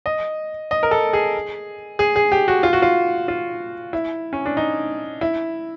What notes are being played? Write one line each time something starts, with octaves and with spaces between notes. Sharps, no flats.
D#5
D#5
A#4
A4
G#4
G#4
G#4
G4
F#4
F4
F#4
F4
F4
E4
C#4
D4
D#4
E4